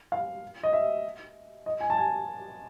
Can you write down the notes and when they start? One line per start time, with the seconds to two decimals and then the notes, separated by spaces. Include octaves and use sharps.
0.12 F5
0.63 D#5
0.73 E5
1.66 D#5
1.81 G#5
1.90 A5
1.98 G#5